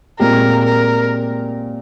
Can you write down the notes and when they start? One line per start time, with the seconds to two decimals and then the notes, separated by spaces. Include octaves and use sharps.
0.19 A#2 G#3 C4 G4 A#4
0.65 A#4